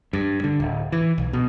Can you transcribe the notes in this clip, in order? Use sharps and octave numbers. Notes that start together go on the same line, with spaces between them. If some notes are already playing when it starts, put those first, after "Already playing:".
G2
D3
D1
E3
B1
B2